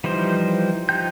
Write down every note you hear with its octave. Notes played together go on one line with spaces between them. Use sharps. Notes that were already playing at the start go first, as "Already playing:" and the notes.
E3 F3 G3 D#4 C5
F3 D#4 G5 G6